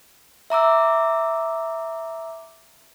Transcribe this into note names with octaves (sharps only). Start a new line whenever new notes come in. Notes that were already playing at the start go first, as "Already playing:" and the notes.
E5 A#5 D6 E6